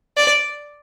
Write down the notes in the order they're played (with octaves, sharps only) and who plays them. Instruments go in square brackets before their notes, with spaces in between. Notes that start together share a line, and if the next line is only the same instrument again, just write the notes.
[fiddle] D5